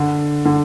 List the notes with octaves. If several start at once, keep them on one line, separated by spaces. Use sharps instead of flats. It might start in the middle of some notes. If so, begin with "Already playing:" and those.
Already playing: D3
D3